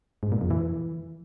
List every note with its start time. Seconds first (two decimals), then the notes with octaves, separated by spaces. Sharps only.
0.23 G#2
0.32 A#2
0.41 F2
0.51 E3